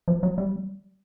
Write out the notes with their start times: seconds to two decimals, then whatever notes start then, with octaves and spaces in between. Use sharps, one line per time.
0.08 F3
0.23 F#3
0.38 G3